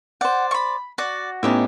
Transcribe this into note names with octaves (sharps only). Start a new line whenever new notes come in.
C5 D5 F#5
B5 C#6
F#4 D5
A2 B3 C#4 D#4 G4 E5